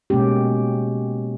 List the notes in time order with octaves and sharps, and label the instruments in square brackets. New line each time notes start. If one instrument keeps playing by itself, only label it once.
[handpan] B2 G#3 A#3 C#4 G4